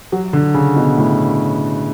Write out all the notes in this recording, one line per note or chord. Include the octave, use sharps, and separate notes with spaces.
F#3
D3
C#3
B2
A2